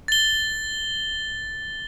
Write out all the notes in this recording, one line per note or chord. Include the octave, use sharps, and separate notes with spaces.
A6 G7